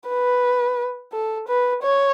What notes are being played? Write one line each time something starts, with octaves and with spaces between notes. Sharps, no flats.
B4
A4
B4
C#5